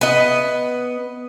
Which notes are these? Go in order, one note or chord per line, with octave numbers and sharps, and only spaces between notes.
B3 D#5